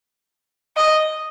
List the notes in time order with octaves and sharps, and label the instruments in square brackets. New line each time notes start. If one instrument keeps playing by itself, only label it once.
[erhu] D#5